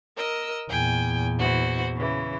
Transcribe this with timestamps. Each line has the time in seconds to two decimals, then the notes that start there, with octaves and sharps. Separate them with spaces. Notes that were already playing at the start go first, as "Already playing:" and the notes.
0.16 A#4 D#5 E6
0.70 E2 A#2 G5 G#5
1.39 E3 F#4 C5
1.95 C#3 E3